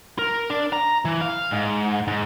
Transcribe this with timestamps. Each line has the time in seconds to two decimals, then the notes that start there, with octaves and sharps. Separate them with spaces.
0.19 A#4
0.50 D4
0.73 A#5
1.05 E3
1.21 F5
1.51 G#2
2.08 G#2